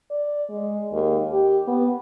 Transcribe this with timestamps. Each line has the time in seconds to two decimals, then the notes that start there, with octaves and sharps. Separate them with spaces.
0.11 D5
0.50 G#3
0.92 D#2
1.32 G4
1.68 B3